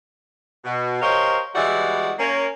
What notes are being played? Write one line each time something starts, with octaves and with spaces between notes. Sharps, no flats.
B2
G4 A#4 C5 C#5 D#5 F5
E3 G3 G#3 E4 F#4 D5
A#3 C#4